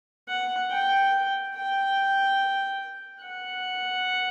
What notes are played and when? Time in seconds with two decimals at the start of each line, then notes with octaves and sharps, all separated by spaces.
0.28 F#5
0.70 G5
1.55 G5
3.21 F#5